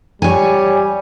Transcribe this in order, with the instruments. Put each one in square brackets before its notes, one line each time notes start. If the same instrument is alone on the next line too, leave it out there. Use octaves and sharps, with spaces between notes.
[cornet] G3 [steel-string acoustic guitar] C#5 G#5